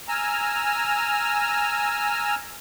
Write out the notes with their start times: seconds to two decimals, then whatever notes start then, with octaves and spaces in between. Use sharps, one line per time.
0.08 G#5 A#5 E6 F6